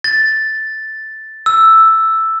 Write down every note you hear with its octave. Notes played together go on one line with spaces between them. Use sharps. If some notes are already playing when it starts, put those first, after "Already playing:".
A6
E6